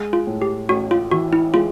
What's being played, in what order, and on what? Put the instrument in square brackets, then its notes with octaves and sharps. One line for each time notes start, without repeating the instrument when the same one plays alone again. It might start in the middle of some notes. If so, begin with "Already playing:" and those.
Already playing: [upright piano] G#3
[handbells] F4
[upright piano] A2
[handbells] G4
[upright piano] A1 [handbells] F#4
[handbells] F4
[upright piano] E3 [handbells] F#4
[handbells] E4
[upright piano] G#3 [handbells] F4